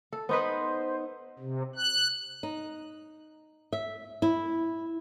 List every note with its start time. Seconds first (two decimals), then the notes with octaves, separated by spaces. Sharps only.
0.13 A4
0.29 B3 D#4 B4 C5
1.39 C3
1.76 F#6
2.43 D#4
3.73 E5
4.22 E4